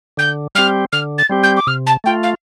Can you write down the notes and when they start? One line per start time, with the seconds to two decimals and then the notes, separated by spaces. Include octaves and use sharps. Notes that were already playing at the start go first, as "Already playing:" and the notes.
0.17 D3 G6
0.55 G3 C4 G4 F6
0.92 D3 F6
1.18 A6
1.30 G3 C4 G4
1.43 G6
1.56 D6
1.67 C3 F6
1.86 A5
2.04 A3 F4 G5
2.23 F5